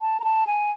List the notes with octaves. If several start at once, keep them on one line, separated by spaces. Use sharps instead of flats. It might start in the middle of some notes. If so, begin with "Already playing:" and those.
A5
A#5
A5
G#5